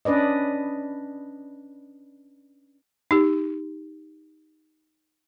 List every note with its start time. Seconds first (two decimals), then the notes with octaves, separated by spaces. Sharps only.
0.05 C#4 D4 B4 D5 D#5
3.11 D#4 G4